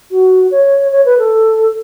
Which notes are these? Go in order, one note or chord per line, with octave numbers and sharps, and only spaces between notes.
F#4
C#5
C#5
B4
A4